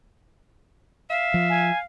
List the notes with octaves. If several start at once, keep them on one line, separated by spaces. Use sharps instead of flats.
E5 F5
F3
G#5